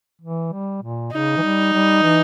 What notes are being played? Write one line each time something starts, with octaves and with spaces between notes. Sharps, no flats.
E3
G3
A#2
C#3 D#4
E3
G3
G3
E3